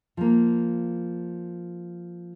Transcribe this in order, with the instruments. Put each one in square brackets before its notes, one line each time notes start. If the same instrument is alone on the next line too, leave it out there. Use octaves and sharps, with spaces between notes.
[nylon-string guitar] F3 A#3